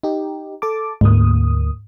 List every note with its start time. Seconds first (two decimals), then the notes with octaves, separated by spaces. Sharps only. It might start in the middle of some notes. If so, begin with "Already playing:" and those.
0.03 D#4 G4
0.62 A4 A5 D6
1.01 D2 G#2 A#3 D#6